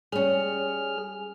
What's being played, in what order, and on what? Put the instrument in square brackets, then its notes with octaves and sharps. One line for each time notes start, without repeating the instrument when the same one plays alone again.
[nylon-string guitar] G3 C#4 [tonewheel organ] G#4 F6